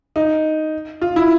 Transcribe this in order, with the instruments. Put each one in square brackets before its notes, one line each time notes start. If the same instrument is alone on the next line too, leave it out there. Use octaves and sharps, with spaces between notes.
[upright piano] D#4
F4
E4